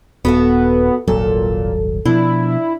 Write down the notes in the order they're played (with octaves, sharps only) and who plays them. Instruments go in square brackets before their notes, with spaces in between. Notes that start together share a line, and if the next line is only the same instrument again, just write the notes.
[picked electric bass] D#1 [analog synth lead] B3 [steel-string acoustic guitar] F#4 A4 E5
[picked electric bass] D#1 G#1 F#3 [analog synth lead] A#2 [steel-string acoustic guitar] A4
[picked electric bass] B2 F3 [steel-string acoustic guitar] D4 [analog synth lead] E4